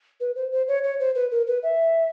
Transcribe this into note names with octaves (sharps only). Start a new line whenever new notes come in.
B4
C5
C5
C#5
C#5
C5
B4
A#4
B4
E5